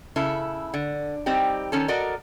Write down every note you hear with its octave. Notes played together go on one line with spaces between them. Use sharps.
C#3 E4 A4
D3
G3 C4 D#4 G4
D#3 C#4 A4
F#4 A4 A#4 D5 D#5